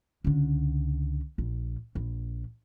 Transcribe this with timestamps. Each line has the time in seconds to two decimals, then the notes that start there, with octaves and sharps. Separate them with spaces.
0.24 C#2 D3
1.38 A#1
1.95 A#1